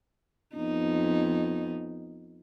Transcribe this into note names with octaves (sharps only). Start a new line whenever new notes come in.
F2 B3 D#4